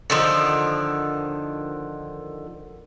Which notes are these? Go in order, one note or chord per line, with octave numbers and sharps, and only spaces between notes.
D3 D#3 F3